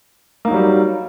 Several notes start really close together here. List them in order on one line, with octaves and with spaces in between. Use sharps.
A#3 D#4 F#3 G3